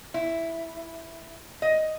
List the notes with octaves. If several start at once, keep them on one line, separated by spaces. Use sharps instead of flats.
E4
D#5